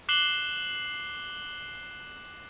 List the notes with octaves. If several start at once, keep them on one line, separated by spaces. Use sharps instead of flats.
D6 F#6 C7 E7 F#7 G7